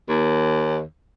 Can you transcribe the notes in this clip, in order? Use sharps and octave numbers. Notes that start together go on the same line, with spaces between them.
D#2